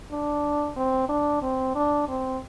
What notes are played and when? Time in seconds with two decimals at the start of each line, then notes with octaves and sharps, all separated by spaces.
0.11 D4
0.77 C4
1.09 D4
1.42 C4
1.75 D4
2.08 C4